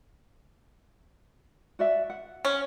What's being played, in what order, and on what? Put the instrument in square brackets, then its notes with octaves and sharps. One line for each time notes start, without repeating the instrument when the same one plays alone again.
[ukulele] F#4 D5 E5
F#5
[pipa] C#4